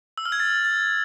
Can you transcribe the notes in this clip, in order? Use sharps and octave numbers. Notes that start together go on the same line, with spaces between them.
E6
F6
G#6
A6
A6